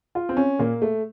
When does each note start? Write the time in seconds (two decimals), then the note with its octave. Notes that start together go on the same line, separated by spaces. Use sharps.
0.15 F4
0.29 C4
0.37 C#4
0.59 A#2 A#3
0.82 A3